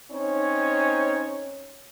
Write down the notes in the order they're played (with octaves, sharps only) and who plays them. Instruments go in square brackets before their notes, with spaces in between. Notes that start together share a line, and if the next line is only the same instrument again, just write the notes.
[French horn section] C4 C#4 D#4 C#5